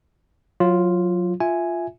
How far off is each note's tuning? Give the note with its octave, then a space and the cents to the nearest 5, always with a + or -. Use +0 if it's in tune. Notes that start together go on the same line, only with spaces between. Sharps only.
F#3 -25 F4 +0
F4 +0 E5 +0 G#5 +0